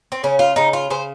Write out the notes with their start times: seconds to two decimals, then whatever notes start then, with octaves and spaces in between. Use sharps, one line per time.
0.12 C4
0.23 C#3 C#4
0.39 F4
0.56 C#3 D#4
0.73 F4
0.90 C#3 C5